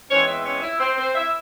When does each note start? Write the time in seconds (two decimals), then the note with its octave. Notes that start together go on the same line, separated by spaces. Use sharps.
0.09 E2 E3 G#3 C4 C#4 C#5
0.27 E4 E5
0.45 C#4 C#5
0.62 E4 E5
0.79 C4 C5
0.97 C4 C5
1.15 E4 E5